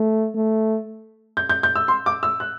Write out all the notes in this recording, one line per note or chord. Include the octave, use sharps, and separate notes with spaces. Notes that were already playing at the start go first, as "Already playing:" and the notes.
Already playing: A3
A3
G6
G6
G6
E6
C6
D6
E6
F#6